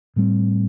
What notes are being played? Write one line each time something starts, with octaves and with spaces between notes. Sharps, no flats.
A2 G3 C4